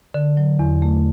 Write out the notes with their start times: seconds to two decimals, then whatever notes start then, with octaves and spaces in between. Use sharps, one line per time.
0.14 D3
0.37 F#3
0.59 E2
0.82 A3